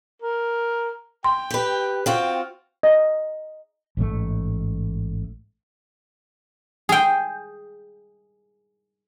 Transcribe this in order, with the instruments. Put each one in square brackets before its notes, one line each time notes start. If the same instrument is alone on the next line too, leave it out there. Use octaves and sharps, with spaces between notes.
[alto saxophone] A#4
[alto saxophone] G5 [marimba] C6
[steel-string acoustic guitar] G4 B4
[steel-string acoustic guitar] C4 F4 F#4 [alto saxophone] G5
[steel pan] D#5
[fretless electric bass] A1 G#2 B2 A3
[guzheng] G#4 G5